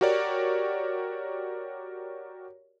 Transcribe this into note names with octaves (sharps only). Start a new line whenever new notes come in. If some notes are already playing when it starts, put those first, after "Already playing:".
F#4 G4 A#4 C#5 D5